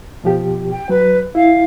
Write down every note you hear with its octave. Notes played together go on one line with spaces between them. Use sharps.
B2 F3 G4
G5
F#3 B4
E4 F5